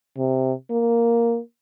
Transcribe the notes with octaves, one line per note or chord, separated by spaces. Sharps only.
C3
A#3